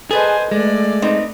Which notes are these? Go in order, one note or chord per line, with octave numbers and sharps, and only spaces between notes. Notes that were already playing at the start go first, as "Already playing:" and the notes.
G#4 A4 B4 C5 D#5 G#5
G#3 A3 D5
C4 D#4 B4